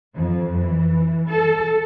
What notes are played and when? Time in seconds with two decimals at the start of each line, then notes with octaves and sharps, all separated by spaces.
0.15 F2
0.60 E3
1.29 A4